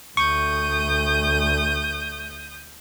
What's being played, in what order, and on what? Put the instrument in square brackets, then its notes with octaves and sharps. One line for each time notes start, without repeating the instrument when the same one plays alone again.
[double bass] D2 A3 [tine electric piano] C#6 [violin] D#6 G6